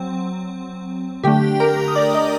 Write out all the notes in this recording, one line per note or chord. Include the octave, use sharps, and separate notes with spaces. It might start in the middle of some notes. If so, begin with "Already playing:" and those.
Already playing: F#3 C4
D3 A3 D4 G4 G5
A#4 A#5
D#6
D5 D6
D#5 D#6